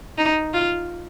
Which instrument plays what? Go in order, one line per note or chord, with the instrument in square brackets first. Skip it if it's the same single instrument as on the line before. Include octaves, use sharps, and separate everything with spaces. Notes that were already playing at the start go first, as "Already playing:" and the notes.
[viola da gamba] D#4
F4